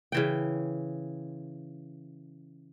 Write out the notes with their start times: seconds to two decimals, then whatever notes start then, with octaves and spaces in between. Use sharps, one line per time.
0.12 C#3 E3 G5